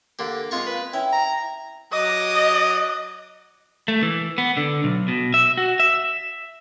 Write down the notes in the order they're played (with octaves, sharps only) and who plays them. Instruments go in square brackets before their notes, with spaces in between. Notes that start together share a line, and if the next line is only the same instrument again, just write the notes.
[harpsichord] D3 G4 [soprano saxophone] A#3
[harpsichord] G#3 F4 C#6 [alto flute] C4
[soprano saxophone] B4
[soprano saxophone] C#4 [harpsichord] E4 [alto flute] G5
[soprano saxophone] A#5
[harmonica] F#3 D6 D#6 [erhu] D#5
[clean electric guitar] A3
E3
B3
D3
B1
B2
E5
F#4
E5